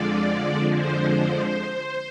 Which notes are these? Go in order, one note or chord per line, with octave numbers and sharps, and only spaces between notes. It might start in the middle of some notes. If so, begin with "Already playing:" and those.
Already playing: F2 D3 F3 G#3 D5
C5